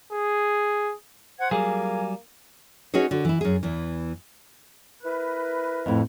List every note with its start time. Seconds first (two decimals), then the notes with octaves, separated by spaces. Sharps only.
0.12 G#4
1.39 C5 F#5 G#6
1.51 F#3 G3 A#3 G#4 G#5
2.94 C#4 D#4 F#4 G#4 B4 C#5
3.11 D3 F#4
3.25 E3 E4
3.41 F#2 G#4
3.63 E2 E3
5.03 E4 A#4 B4
5.86 F2 A2